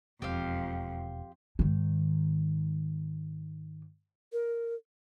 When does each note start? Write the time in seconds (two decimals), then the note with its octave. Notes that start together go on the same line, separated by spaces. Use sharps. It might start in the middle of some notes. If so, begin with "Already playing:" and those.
0.22 E1 F2 G4 C5 F5
1.59 G#2 D#3
4.33 A#4